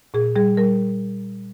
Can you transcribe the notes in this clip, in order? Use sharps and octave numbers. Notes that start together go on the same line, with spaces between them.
A#2 G#4
G3 G#4
G3 A#4